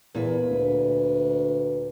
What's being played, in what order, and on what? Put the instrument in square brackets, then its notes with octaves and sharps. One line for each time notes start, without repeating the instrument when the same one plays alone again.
[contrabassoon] E2 [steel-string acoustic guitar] A#2 B4
[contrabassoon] D2